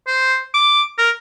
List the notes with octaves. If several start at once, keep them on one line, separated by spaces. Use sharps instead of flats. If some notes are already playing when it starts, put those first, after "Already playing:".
C5
D6
A#4